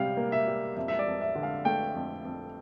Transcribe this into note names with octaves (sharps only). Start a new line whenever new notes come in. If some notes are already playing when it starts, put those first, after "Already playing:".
Already playing: C3 G3 F5 G5
A#3
E5
G3
F2 E5
E5
D5
F2
E5
D3
F5
A3 G5
F2
F2